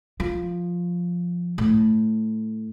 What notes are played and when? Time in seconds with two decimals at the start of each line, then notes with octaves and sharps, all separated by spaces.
0.20 F3
1.58 A2